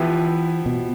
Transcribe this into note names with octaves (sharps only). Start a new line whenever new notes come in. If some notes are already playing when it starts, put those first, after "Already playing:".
Already playing: E3 F3 B3 E4 G4 B4
B2